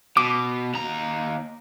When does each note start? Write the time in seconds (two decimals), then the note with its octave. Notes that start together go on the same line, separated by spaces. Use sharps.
0.17 B2 D6
0.74 D#2 A#5